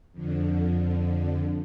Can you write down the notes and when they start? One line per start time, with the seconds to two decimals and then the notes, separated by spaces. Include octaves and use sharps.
0.12 F2 D3